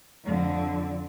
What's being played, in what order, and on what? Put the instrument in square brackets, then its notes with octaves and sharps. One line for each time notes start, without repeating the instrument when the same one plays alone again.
[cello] F2 D3